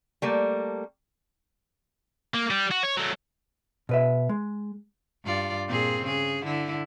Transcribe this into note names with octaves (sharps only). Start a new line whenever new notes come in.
G3 A3 A#3
A#3
G3
F#4
C#5
F#3 A3
B2 B4 E5
G#3
G2 F4 D5
A#2 C4 G#4
C#3 G#4
D3 E4